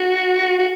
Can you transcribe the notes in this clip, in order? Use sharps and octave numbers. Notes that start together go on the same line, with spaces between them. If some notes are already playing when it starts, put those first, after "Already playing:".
Already playing: F#4
F#4